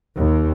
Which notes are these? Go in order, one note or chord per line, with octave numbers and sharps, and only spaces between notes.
D#2